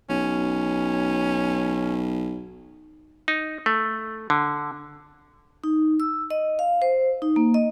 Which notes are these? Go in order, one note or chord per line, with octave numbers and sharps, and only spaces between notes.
B1 C#4
D#4
A3
D3
D#4
E6
D#5
F5
C5
D#4
A#3
D#5